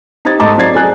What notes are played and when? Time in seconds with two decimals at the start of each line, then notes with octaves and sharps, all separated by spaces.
0.25 D#4 G4 C5 G#6 A6
0.40 G#2 A3 D#5 A5 A#5 D6
0.58 F#3 C5 D5 G#6 A6 C7
0.75 G#4 G#5 F#6